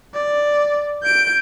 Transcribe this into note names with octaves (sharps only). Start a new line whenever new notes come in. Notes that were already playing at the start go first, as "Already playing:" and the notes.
D5
G6 D7